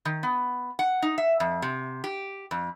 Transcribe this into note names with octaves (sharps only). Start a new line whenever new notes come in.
D#3
B3
F#5
D#4
E5
F2
C3
G4
F2